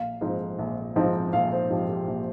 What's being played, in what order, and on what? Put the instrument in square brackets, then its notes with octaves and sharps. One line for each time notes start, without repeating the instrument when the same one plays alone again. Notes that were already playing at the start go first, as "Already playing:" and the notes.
Already playing: [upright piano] A#1 F5
G#2 F3 C4 D#4
A#1
G#2 F3 C4 D#4
A#1 F5
C5
G#2 F3 C4 D#4 G4
G4
A#1